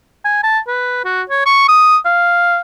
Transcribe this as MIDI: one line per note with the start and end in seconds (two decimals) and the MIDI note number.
0.25 0.40 80
0.43 0.59 81
0.67 1.02 71
1.04 1.22 66
1.29 1.42 73
1.46 1.65 85
1.68 1.97 87
2.05 2.59 77